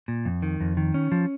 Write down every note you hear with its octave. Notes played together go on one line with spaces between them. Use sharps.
A#2
F2
D#3
F2
D#3
C#4
F3